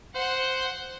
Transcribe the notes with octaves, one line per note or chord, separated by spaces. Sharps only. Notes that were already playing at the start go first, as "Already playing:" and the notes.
C5 F#5